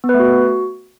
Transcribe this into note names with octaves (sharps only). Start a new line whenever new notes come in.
B3
B4
A3
F#4